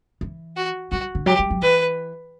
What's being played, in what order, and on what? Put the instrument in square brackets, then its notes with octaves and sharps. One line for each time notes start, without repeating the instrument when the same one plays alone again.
[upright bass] E3
[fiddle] F#4
[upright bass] G3 [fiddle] F#4
[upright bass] D3
[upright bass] F#3 [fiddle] G4
[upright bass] G3
F#3
[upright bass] E3 [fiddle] B4